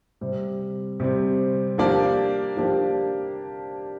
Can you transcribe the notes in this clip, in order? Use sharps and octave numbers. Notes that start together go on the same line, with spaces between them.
C3 G3 C4
C3 G3 C4
F3 A#3 D4 G4 D5
F3 A#3 D4 G4 D5